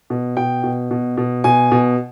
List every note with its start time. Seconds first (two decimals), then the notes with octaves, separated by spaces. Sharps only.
0.10 B2
0.37 B2 G5
0.63 B2
0.91 B2
1.17 B2
1.44 B2 G#5
1.71 B2